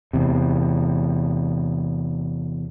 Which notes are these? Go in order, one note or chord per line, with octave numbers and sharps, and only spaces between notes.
E2 C3